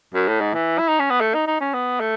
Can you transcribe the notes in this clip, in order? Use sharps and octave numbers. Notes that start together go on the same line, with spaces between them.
F#2
A2
G#2
E3
E4
D#4
C#4
B3
A3
D#4
D#4
C#4
B3
A3